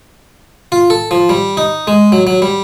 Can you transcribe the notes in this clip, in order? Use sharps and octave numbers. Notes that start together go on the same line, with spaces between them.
F4
A4
F3
G3
D#4
G#3
F#3
F#3
G3